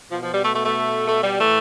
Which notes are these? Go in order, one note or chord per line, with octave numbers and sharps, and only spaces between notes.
B2 F3
F3
G3
A3
A3
A3
A3
G3
A2 E3 A3